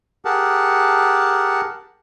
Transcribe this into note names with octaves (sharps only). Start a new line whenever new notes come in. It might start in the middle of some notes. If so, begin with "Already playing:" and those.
G4 G#4 A#4 F#5 A5